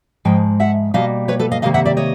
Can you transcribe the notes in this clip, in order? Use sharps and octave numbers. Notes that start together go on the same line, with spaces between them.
G#2 F3 G#3 G5
E5 F#5
B2 G3 A#3 D#5 F5
B4 C#5
A4 B4
D#5 F5
C3 D#3 G3 A#3 D#5 F5
E5 F#5
D5 E5
C#5 D#5